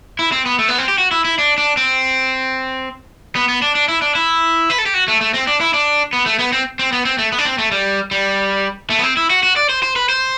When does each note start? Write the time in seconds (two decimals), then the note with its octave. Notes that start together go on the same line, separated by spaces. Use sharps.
0.19 E4
0.32 C4
0.46 B3
0.59 A3
0.69 B3
0.78 C4
0.88 G4
0.98 F#4
1.11 E4
1.25 E4
1.38 D4
1.58 D4
1.77 C4
3.35 B3
3.49 B3
3.62 D4
3.75 D4
3.88 E4
4.02 D4
4.15 E4
4.70 B4
4.78 A4
4.86 G4
4.94 F#4
5.08 A3
5.21 A3
5.34 C4
5.47 D4
5.61 E4
5.74 D4
6.13 B3
6.26 A3
6.39 B3
6.53 C4
6.79 C4
6.92 B3
7.05 C4
7.18 A3
7.32 B3
7.39 D4
7.45 C4
7.58 A3
7.71 G3
8.11 G3
8.90 A3
8.99 B3
9.03 C4
9.17 E4
9.30 F#4
9.43 F#4
9.56 D5
9.69 C5
9.83 C5
9.96 B4
10.09 C5